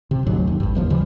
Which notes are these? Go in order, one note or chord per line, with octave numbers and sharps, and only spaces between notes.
C3
D2 G#2 F#3
D#2
G#1 G2
A1 D#2 F3
C#3 E3 F3 G3